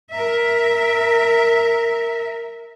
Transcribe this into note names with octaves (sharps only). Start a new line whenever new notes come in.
A#4 E5